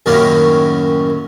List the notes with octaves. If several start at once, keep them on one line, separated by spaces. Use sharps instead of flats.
F#2 A2 D#3 F#3 A#3 C#4